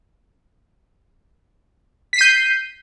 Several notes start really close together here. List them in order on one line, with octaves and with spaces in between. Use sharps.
B6 C7 D#7 G6